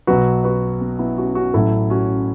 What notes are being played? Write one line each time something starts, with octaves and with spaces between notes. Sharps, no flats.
B1 B2 F#3 F#4 B4
F#4 B4
B3
B3 E4
C#4 F#4
C#4 F#4
A1 A2 F#3 E4 A4
C#4 F#4